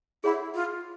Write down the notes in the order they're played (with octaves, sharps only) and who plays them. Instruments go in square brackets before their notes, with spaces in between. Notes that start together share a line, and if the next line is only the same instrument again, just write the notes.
[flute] E4 [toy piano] G#4 C#5 F#5 B5
[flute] F4